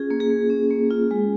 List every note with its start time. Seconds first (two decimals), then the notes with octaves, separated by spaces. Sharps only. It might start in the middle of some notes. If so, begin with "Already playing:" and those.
Already playing: C#4 F4 G#4
0.10 A#3
0.20 G#4
0.30 A#3
0.50 C#4
0.70 A#3
0.91 F4
1.11 G#3